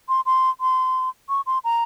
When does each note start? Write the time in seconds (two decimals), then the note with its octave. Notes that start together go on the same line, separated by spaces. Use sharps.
0.09 C6
0.26 C6
0.61 C6
1.29 C#6
1.46 C6
1.64 A#5